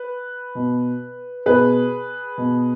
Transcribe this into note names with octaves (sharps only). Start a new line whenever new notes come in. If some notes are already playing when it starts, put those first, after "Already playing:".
Already playing: B4
B2
B2 G#4 B4
B2